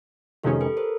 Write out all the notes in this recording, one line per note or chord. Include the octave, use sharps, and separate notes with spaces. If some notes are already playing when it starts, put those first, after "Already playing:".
F2 C3 D#3 G#3 C#4 G4 A4
A4 B4
A#4 C5